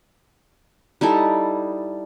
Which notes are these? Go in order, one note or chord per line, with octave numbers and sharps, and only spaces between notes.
G3 D#4 E4 A4